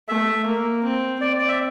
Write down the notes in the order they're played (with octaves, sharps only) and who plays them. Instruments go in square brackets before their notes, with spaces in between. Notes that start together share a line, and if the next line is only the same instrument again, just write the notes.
[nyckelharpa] A3 [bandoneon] E5
[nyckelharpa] A#3
C4
[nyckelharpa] C4 [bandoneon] D5
[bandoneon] D5
E5